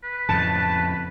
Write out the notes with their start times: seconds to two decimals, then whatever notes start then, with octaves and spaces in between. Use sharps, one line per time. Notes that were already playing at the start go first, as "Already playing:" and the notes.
0.04 B4
0.29 F2 A2 C#3 A5